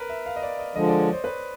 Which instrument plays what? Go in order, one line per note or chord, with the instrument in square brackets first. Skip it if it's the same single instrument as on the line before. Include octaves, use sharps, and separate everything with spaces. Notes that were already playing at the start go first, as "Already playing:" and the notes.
Already playing: [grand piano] A#4 B4
E5
F5
D#5
D5
D#5
[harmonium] D3 F3 G#3 [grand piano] D#5
[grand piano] D5
C#5
C5
B4